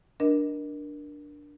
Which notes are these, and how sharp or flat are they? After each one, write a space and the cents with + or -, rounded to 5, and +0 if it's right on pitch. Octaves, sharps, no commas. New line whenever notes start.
D4 +0 A#4 +20 D#5 +5